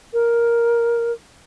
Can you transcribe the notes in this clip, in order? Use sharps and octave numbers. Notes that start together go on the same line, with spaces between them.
A#4